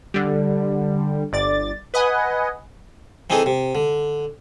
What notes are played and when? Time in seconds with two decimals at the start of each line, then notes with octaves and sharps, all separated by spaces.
0.14 D3 G3
1.33 G1 D5 A6
1.94 B4 D#5 F#5 G#5
3.30 E3 C4 D#4 G#4 A4
3.46 C3
3.75 D3